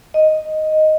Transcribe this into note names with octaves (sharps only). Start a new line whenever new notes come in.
D#5